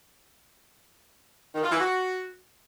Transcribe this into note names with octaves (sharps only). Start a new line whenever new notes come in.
D#3
F4
E3
F#4